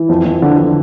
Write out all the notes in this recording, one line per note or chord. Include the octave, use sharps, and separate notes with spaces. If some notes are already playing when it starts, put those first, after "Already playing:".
Already playing: E3
F2
F2
D3
D3